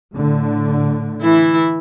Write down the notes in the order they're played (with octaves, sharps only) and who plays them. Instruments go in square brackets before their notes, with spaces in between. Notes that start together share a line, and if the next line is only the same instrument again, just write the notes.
[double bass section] A2 D3
[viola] E3 E4